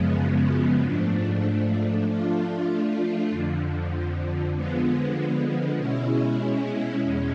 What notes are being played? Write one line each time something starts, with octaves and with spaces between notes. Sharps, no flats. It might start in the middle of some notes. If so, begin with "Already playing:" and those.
Already playing: F#2 C#3 F3 G#3 B3
G#2 F3 A3 D4
F3 A3 D4 F4
F2 D3 F3
D3 F3 G#3 B3
B2 G#3 C#4 E4
E2 B2 G#3 C#4